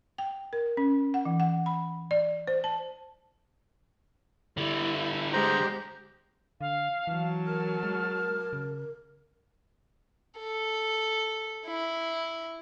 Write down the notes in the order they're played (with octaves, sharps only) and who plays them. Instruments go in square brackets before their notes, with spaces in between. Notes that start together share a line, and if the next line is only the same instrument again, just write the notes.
[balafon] G5
A#4
C#4
F#5
E3
F#5
B5
D5
C5
A5
[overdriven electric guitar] D3 G3 [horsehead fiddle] E4
[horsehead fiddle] G#3 G4 [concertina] C5 A#5
[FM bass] D3 [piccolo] F5
[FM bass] E3 [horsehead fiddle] F#3 A5
[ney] A#4 [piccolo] F6
[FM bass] G#3
C#3
[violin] A4
E4